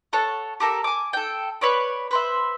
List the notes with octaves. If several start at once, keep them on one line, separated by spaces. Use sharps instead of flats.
A4 C#5 F#5
G4 A4 A#4
G#5 D6
A4 G5
B4 C#5 D5
B4 C5 E5